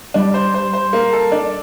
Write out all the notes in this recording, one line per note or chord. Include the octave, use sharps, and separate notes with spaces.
G3 D4
C5
C5
C5
A#3
A4
D4